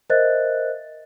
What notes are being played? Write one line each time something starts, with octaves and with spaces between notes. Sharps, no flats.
A#4 C5 D#5 E5 F#6 A6